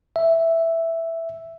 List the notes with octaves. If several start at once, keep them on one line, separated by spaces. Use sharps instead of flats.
E5